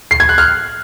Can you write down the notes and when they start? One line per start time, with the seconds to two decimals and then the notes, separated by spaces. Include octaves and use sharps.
0.11 C7
0.20 G#6
0.29 F#6
0.38 F6